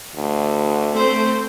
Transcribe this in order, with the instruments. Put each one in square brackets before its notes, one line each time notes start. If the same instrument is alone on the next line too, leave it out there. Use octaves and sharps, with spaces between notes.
[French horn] D2
[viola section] A3 C4 C5